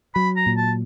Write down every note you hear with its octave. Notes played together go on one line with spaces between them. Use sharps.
F#3 B5
A#5
A#2
A5